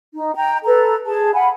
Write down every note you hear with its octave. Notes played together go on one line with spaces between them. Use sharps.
D#4
G5 A#5
A4 B4 A#5
G#4 A5
F5 F#5 G#5 B5